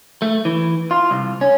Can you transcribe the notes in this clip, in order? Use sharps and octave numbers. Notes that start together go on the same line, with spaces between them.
A3
E3
F4
C2
C#4